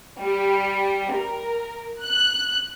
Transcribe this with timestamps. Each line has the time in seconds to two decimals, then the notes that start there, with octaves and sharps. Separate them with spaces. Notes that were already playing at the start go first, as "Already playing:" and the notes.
0.20 G3
1.16 A#4
2.03 F#6